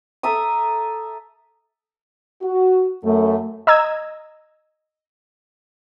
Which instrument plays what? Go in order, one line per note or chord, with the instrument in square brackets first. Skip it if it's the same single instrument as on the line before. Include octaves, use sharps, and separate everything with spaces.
[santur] A4 E5 A#5 D#6
[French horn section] F#4
F#2 A3
[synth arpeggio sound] D#5 A#5 E6 G#6